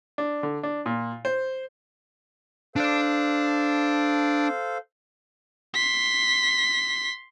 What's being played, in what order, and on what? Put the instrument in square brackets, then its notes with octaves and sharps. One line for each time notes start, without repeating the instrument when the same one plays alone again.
[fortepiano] D4
D3
D4
A#2
C5
[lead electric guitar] D4 D5 [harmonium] A4 C5 F5
[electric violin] C6 B6